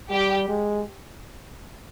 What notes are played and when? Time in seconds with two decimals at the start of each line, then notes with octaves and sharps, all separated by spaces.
0.11 G3 G4
0.49 G#3